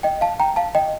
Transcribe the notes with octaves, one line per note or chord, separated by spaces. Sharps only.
D#5 G5
F5 A5
G5 A#5
F5 A5
D#5 G5